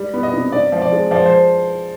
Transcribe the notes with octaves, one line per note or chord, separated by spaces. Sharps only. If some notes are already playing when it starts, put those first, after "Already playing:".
Already playing: G3
B3
D#5
C3
C3 D5
F3
D5
G#3
F3 D5
C5